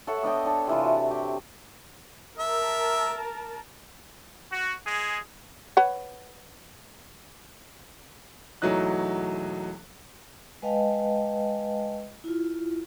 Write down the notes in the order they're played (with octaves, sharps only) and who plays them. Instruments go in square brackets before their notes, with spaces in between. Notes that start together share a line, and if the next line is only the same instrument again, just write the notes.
[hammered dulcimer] A4 C#5 E5 F#5
B3 D4 D#5 G5
D4 C#5 A5
C3 E3 F4
F#4
G4
[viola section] A#4 A5 [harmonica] E5
[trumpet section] F#4
G#3 G#4
[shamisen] B4 C#5 F#5
[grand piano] E1 E3 F#3 A3 D#4 F#6
[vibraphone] G#3 B4 D#5 F5 G5 A5
E4 F4